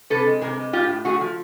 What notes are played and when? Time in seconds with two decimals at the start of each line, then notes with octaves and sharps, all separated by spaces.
0.10 C3 A4 B4
0.27 G#3
0.41 C3 G#4 A#4
0.58 G#3
0.73 A2 F4 G4
0.89 A2
1.05 A3 F#4 G#4
1.21 F3